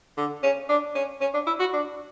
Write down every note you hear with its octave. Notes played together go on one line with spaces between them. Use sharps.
D3
C#4
D4
C#4
C#4
D4
E4
F#4
D4